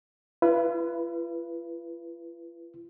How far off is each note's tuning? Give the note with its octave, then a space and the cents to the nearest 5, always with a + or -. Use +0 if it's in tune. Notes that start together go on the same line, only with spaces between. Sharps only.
F4 -45 B4 -5